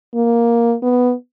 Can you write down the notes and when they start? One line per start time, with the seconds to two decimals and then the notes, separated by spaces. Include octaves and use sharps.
0.14 A#3
0.82 B3